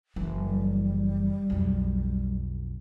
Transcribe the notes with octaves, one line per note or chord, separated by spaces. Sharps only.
F#1 E3
G3
B1 F2